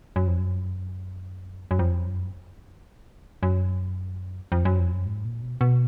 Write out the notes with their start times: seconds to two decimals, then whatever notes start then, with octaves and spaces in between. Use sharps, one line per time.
0.16 F#2
0.27 F2
0.39 F#2
1.71 F#2
1.79 F2
2.06 F#2
3.43 F#2
4.52 F2
4.65 F#2
4.79 F2
4.92 F#2
5.06 G#2
5.25 A#2
5.42 B2
5.61 B2